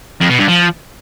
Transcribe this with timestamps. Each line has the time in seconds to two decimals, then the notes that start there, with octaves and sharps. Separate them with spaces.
0.21 F2
0.30 B2
0.39 G2
0.48 F3